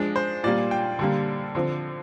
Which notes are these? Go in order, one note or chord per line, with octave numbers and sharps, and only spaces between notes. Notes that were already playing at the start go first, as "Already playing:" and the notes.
Already playing: F3 G#3 D4
C5
A#2 G3 A#3 D5
G5
D3 G3 A#3
D3 F3 C4